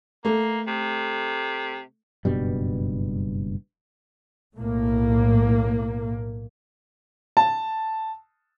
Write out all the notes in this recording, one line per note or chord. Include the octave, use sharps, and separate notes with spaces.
A3 A#3
C3
F#1 G2 B2 G3
B1 A2 A#3
A5